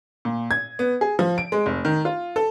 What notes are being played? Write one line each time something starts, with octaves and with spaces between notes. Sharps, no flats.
A#2
G#6
B3
G#4
F3
D7
G#3
F1
D#3
F4
A4